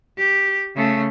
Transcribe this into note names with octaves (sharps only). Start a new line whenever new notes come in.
G4
C#3 A3